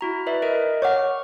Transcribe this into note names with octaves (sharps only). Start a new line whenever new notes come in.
E4 F#4 A#5
B4 D5 E5
A#4 D#5 D7
C#5 F#5 C#6 D6 F6